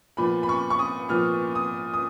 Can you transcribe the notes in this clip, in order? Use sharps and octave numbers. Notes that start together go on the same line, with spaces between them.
A#2 F3 B3 B5
B5
C#6
C#6
D#6
A#2 F3 B3 F6
D#6
D#6